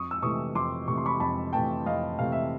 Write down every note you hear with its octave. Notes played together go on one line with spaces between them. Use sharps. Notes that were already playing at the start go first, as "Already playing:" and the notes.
Already playing: F2 C#6 D#6
E6
C3 E3 A3 C#6 D#6
F2 C6 D6
C3 E3 A3 C#6
C6
B5 C#6
F2 A5 B5
C3 E3 A3 G5 A5
F2 D#5 F5
C3 E3 A3 F5
E5